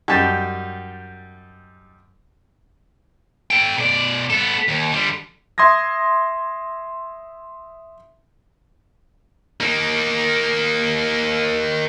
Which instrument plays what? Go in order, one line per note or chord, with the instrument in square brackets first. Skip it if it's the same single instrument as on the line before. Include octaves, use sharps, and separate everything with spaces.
[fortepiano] F#2 G3 D#4 G4 A5
[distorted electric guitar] A4 G5
B2 D5
B3 A4
D#2
D3 G3
[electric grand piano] E5 C6 D#6 G#6 A#6
[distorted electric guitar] A#3 D#4